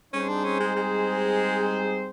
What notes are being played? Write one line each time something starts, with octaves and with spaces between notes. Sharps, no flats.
G3 C4 C#4 D#4 G#4 C5
D4
C#4
G#3
G#3